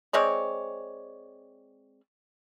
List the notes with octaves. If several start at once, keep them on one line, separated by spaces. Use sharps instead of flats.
G#3 C4 C#5 D5